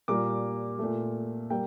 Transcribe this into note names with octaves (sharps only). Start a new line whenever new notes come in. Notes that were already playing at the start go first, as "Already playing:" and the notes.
A#2 G3 A#3 D6
A#2 A3
G3 A#3 G5